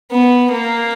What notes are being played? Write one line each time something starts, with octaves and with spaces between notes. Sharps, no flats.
B3
A#3